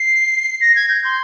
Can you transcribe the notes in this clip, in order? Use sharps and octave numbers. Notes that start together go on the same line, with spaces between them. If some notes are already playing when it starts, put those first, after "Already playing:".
Already playing: C7
A#6
G#6
G6
C6